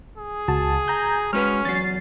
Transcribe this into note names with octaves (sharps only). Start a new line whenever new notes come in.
G#4
C#2 F#4 A5
G#5 A#5 G6
G#3 C#4 F#4 B4 F6
E2 F#3 A6 C7